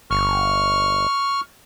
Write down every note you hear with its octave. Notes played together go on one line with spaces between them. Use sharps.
G1 C#6 F6